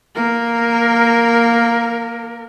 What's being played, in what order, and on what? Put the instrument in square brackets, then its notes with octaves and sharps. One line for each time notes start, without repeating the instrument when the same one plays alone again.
[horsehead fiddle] A#3 A#4